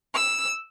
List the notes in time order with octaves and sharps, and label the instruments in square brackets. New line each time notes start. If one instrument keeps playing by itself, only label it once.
[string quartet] E6